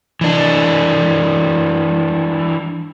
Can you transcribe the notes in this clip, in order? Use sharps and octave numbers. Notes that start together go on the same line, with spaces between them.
E3 D4